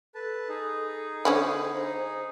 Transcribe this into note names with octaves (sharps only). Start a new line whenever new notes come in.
A4 B4 A5
D#4 G#4
D3 C#4 C5 B5